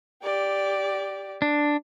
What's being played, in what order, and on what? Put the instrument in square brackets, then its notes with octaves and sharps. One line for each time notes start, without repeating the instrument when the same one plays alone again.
[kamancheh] G4 D5
[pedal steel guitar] D4